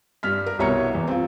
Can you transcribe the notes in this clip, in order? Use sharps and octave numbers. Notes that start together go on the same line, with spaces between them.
G2 F6 B6
A#4
C2 B2 C#5 A#5 C#7
E2
C4 F4